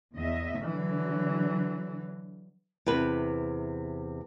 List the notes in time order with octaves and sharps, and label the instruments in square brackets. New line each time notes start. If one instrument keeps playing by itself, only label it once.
[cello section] E2 D#5 E5
[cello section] D3 F#3 [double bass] E3
[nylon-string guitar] E2 C3 B4